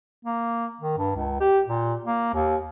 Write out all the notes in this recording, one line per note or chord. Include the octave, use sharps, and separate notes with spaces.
A#3
D#3
G2
C#2
G4
A#2
A#3
D#2